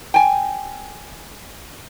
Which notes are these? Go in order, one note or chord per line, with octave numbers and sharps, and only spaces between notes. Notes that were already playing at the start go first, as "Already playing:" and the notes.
G5 G#5